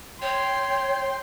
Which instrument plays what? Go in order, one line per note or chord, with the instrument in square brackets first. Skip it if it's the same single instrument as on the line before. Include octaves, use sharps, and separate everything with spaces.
[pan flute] C#5 [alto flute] G5 [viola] C6